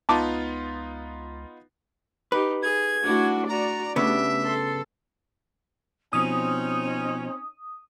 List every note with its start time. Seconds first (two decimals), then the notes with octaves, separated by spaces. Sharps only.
0.09 C#2 B3 D#4 F4 A5 D6
2.32 D#4 G4 B4
2.63 G#4 G#6
3.03 A3 D4 E4 F#4
3.49 F#4 D5 A#5
3.96 C#3 A3 B3 D4 G4 E5
4.43 A4 C6
6.13 B2 F3 C4 C#4 D#4 D#6